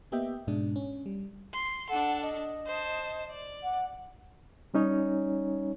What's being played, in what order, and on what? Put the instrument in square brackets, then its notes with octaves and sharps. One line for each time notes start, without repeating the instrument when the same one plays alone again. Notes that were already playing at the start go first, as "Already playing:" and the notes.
[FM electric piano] A#3 B3 G4 D#5 E5 G5
G#2 B2 G#3 D4
C#4
G3
[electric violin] C6
[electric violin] D4 A4 [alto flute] F#5
[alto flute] D#5
[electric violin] C5 A5
D5
[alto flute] F#5
[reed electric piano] G3 C#4 D#4 C#5